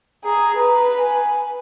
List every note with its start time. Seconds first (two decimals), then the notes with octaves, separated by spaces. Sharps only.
0.24 G#4 A#5
0.57 B4 A#5
0.99 G#5